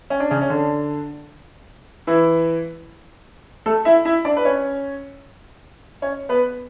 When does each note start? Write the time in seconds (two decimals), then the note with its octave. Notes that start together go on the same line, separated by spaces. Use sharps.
0.10 C#4
0.20 D4
0.30 C#3 C#4
0.41 C#4
0.50 D3 D4
2.07 E3 E4
3.66 A3 A4
3.85 E4 E5
4.05 E4 E5
4.25 D4 D5
4.37 B4
4.45 C#4 C#5
6.02 C#4 C#5
6.29 B3 B4